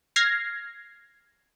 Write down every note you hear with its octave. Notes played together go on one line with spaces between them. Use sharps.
F6 G#6 A#6 C7